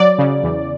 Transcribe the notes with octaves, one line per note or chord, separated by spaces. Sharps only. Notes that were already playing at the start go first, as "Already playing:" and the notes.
Already playing: F#3 D5
C#3
E2